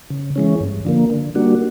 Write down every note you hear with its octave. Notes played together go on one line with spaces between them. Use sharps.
C#3
E3 G#3 C#4
G2
D3 F3 A#3
D3
G3 A#3 D4 F#4